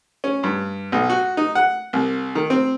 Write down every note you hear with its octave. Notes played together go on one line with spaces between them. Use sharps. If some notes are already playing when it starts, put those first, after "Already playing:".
C#4
G2
B1
F#4
D#4
F#5
C2
D#3
C4